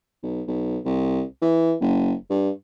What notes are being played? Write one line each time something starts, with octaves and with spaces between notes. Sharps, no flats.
B1
B1
C2
E3
F#1
G2